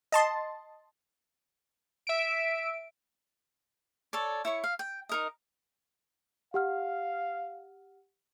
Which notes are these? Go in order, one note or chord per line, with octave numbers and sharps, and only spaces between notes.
D#5 A5 C6
E5 D7
A4 C#5 D5
E4 C#5 C#6
F5
G5
D#4 A#4 D#5
G4 F5 F#5 F6